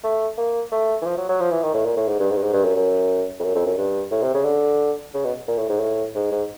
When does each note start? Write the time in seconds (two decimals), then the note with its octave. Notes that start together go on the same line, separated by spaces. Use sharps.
0.04 A3
0.38 A#3
0.72 A3
1.02 E3
1.06 F3
1.17 F#3
1.29 F#3
1.40 F3
1.52 E3
1.63 D#3
1.74 A2
1.85 A#2
1.97 A2
2.08 G#2
2.20 G2
2.31 G#2
2.37 G2
2.42 G#2
2.53 G2
2.65 F#2
2.76 F#2
3.40 F2
3.44 F#2
3.56 F2
3.66 F#2
3.78 G2
4.11 A2
4.23 C3
4.34 C#3
4.45 D3
5.14 C#3
5.25 B2
5.48 A#2
5.58 A2
5.69 G#2
5.80 A2
6.15 G#2
6.32 G#2